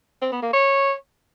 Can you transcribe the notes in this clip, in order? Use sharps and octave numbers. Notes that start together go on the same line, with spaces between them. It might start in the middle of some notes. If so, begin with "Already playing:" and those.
C4
B3
A#3
C#5